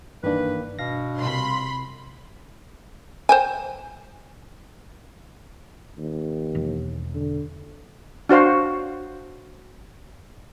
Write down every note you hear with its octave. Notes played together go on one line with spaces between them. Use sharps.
G2 D#3 E3 A#3 D4 B4
B2 F5 A#6
C2 B5 C6
C5 G5 G#5
D#2
E1
D3
D4 F#4 C5 F5